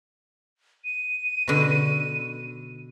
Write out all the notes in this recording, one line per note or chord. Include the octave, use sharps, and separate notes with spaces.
D#7
B2 D3